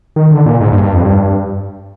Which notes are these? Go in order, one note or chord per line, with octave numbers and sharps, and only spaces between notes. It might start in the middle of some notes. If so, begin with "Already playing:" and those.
D#3
D3
A#2
G#2
G2
G2
F2
G2